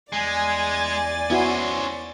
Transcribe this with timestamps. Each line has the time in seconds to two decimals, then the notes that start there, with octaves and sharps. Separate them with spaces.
0.13 E2 G#3 D5 G#5 A6
1.30 B3 C#4 E4 F#4 C5